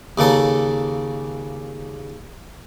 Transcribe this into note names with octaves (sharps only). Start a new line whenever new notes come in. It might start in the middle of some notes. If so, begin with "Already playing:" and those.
D#2 C#3 A#3 A4